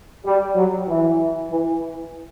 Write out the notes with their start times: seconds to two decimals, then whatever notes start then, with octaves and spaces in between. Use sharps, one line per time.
0.26 G3
0.56 F#3
0.88 E3
1.51 E3